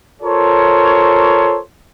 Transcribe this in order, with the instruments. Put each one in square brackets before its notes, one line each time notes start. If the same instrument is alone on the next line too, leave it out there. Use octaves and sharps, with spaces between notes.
[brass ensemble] F4 A4 A#4 C5 C#5